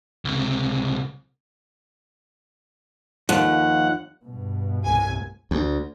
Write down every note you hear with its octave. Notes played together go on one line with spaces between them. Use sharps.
C#2 C3
D#2 F3 F#5
G2 B2
C2 A2 G#5
D2